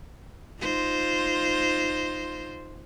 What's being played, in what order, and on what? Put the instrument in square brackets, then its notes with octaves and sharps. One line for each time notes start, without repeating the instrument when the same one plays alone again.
[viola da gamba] D#4 F4 C5